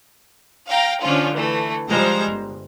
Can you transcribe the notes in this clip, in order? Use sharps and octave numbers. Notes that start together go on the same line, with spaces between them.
F5 G5 A#5
D3 F3 C#4 F4
E3 A3
F3 G3 G#3 C5 A#5
G1